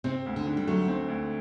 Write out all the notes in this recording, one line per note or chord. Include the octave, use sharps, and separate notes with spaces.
C3 C4
D2
D3
D3
G3
F#3 A3
C4
D2